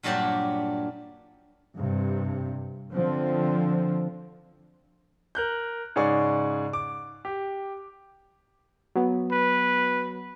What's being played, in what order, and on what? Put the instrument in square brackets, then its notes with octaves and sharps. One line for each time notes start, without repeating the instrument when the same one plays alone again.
[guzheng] G2 A#2 F#3 G3 D4 G4
[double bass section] G2 C3
D3 F3 C4
[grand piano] A#4 F#6 G6
G#2 C#3 G#4 D5 C#6
D6
G4
[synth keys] F#3 B3
[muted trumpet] B4